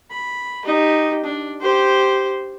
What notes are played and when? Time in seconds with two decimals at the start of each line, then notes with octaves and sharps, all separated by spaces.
0.10 B5
0.65 D#4 G4
1.24 D4
1.61 G4 C5